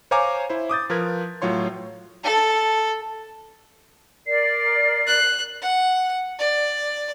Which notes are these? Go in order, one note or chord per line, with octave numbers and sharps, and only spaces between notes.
C5 C#5 F5 G#5 A#5 D6
E4 C5
D6 D#6 G6 A6
F3 A#4 B4 G#6
A2 F#3 F4 C#5 C6
A4
A#4 D5 C7
F#6
F#5
D5